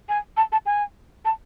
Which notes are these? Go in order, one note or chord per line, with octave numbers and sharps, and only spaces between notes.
G#5
A5
A5
G#5
A5